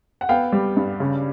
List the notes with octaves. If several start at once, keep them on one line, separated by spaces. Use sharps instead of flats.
F#5
B3 F5 G5
G3
G2
C#3